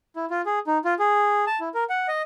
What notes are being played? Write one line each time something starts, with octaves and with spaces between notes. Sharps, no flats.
E4
F4
G#4
D#4
F4
G#4
A5
E4
A#4
F#5
D#5